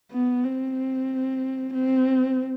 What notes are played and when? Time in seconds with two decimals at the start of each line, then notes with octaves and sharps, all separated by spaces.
0.12 B3
0.43 C4
1.73 C4